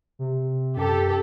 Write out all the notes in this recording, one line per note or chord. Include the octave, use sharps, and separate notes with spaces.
C3
F#2 G4 A4